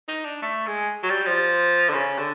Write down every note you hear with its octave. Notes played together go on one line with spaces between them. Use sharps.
D#4
D4
A3
G#3
F#3
G3
F3
D3
C#3
D3